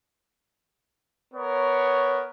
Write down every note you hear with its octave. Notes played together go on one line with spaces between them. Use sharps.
B3 A#4 C#5